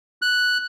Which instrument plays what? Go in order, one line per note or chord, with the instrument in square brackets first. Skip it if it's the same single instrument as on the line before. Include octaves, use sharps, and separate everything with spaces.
[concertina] F#6